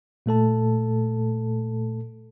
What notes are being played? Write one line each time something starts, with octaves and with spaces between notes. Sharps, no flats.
A#2 A3 A4 A5